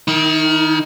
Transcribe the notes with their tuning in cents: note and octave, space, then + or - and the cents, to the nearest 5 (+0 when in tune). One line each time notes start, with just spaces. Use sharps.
D#3 +0 E4 -40